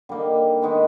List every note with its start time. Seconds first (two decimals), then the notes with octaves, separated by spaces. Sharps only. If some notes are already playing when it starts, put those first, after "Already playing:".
0.09 D3 G3 A#3 D#4
0.62 D#3 G#3 B3 D#4